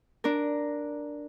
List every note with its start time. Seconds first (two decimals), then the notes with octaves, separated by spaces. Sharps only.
0.24 D4 A#4